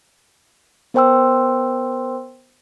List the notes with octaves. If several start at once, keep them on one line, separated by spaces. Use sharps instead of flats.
B3 A#4 C5 G5 C6 E6